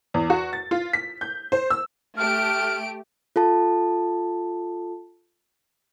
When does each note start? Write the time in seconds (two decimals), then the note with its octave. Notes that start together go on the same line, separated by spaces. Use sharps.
0.14 E2
0.30 F#4
0.53 A6
0.71 F4
0.93 B6
1.21 G6
1.52 C5
1.70 E6
2.17 A3 G4 F6 D7
3.36 F4 A4 A5